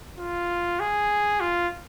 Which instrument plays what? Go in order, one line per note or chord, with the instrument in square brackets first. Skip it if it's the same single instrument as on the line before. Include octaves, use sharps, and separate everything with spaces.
[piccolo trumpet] F4
G#4
F4